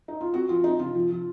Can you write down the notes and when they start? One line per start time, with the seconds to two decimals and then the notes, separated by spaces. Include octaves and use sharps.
0.08 D#4
0.21 F4
0.33 C4 F#4
0.49 F3 F4
0.64 C4 D#4
0.79 C3 F4
0.95 F3
1.11 F3